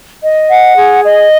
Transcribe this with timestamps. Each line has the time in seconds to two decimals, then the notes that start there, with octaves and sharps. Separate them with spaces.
0.23 D#5
0.50 F#5
0.76 G#4
1.04 D#5